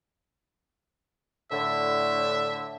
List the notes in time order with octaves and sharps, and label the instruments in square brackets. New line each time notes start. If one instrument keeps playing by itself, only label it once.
[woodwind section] A2 D3 [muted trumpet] E5